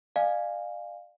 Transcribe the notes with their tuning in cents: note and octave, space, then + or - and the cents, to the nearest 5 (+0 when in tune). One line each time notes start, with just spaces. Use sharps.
D5 +40 F5 +0 G#5 +0